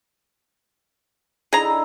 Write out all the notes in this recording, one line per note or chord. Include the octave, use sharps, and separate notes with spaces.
D3 D#4 E4 G#4 A#5